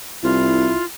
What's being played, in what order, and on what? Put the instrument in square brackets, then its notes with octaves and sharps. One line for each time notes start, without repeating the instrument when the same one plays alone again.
[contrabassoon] C2 [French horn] E4 [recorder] F4